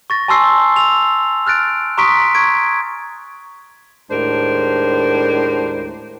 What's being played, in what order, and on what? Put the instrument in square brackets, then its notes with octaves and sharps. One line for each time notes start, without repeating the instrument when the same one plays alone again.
[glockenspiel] C#6 A6 A#6
G#5 A5 C6 C#6 E6 C7
E6 F7
F6 F#6 A6 D7
A#5 C6 C#6 D#6 B6 D7
C#6 G#6 D7
[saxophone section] D#2 A2 G#3 D4 A#4 C5